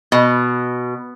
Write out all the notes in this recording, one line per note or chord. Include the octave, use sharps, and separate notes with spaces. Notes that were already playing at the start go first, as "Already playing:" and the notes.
B2